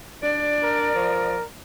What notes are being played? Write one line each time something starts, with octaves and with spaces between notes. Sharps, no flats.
D4 D5
A#4
F3